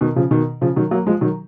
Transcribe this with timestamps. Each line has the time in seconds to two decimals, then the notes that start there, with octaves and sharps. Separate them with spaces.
0.01 B2 D#3
0.16 C#3 F3
0.31 B2 D#3
0.61 C#3 F3
0.76 D#3 F#3
0.91 F#3 A#3
1.07 F3 G#3
1.21 D#3 F#3